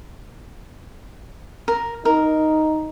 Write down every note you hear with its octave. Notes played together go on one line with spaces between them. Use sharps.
A#4
D#4 A#4